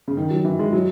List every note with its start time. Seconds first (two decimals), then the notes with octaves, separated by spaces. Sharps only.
0.08 C#3
0.17 D#3
0.31 F#3
0.45 E3
0.59 G#3
0.73 F#3